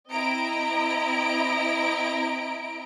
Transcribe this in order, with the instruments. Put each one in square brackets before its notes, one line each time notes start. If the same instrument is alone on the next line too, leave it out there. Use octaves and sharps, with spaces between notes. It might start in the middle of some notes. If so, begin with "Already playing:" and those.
[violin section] C4 E4 D#5 A#5 D7